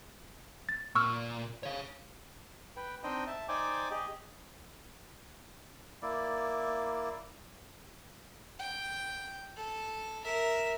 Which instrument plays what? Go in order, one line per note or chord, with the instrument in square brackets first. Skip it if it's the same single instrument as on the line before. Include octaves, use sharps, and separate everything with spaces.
[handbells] A6
[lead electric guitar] A#2 [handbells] C#6 E6 F6
[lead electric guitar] C#5 F5
[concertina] B4 G5
C4 D4 D#4 C5 D#5 G5
E5 A5
D#4 C5 D5 G5 G#5 D6
G4 G#4 D#5
A#3 E4 D5
[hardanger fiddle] G5
A4
A#4 E5